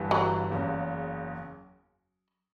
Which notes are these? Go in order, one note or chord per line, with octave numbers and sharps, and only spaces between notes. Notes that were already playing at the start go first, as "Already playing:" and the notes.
Already playing: G1 G2 E3
F#3
F#1 E2 C#3